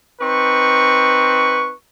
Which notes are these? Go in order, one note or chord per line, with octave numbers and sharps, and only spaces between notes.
C4 D#4 B4 C#6